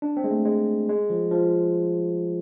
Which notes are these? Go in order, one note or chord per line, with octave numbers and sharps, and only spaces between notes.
D4
C4
G#3
A3
G#3
G#3
F3
F3